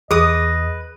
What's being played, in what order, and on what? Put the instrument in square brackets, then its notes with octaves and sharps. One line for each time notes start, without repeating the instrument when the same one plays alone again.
[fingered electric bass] E2 [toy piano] G#4 [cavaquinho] B4 D#6 [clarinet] D#5